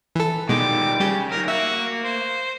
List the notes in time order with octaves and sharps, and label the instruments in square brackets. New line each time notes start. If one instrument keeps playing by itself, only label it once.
[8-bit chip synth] E3 A4
[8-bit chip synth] B2 G#3 [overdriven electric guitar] D#3 G3 [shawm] D6
[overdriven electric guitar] C#3 [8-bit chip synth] G3 G4
[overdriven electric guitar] D#3 F#3 [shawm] A#4
[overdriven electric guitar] A#3 [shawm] F#4 [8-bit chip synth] E5
[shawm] C5